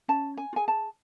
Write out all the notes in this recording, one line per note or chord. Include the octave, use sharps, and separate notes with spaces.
C#4 A5
G#5
F4
G#4 G#5
A5